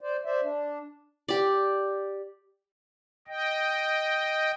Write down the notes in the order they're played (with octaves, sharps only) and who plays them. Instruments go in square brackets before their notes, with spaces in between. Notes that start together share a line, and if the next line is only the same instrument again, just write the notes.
[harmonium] C5 D5
C5 D5 E5
D4
[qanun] G4 D5
[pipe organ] D#5 G5